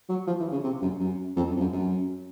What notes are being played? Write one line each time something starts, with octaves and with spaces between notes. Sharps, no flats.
F#3
F3
E3
C#3
C3
F#2
F#2
F2
F#2
F2
F#2
F#2